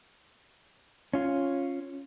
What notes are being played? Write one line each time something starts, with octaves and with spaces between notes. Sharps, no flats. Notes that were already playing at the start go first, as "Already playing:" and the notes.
C#4 F4